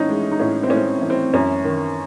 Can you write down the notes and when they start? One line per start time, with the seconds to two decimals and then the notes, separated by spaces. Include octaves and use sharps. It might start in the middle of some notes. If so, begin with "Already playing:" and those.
Already playing: A2 E3 C#4 D#4
0.09 G#3
0.32 D#4
0.40 A2 C#4
0.63 C4
0.70 A2 C#4
0.77 C4
1.02 E3
1.10 C4
1.33 F#2 C#4
1.64 D#3